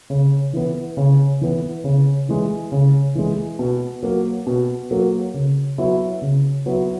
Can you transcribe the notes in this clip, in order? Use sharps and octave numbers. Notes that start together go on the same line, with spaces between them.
C#3
E3 B3
C#3
E3 B3
C#3
E3 G#3
C#3
E3 G#3
B2
F#3 A#3
B2
F#3 A#3
C#3
F#3 B3 E4
C#3
F#3 B3 E4